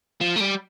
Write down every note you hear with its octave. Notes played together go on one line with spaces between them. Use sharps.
F3
A3
G3